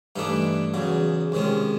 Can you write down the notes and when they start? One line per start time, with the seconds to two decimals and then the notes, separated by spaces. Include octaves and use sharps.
0.16 G2 E3 A3 D4 D#4
0.74 E2 C#3 F#3
1.32 F2 C3 D#3 G#3 C#4